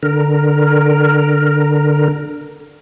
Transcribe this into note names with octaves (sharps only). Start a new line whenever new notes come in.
D3 A#4